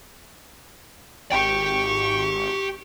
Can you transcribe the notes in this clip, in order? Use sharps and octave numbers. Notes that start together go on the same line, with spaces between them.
G#1 G4 G5 C#6